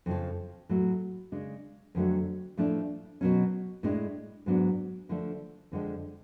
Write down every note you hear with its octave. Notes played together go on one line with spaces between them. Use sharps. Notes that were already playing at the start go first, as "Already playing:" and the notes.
F2 C#3 F3
A2 F#3 A3
C#3 G#3 D4
F2 D3 F#3 A3
A2 F3 A3 D4
B2 F#3 C#4
A2 G#3 D4
G#2 F#3 B3 D4
D3 F3 A3 D4
F2 D3 F3 G#3